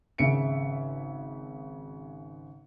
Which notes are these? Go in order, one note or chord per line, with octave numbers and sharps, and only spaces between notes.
G#1 C#3 E5 C#7 D7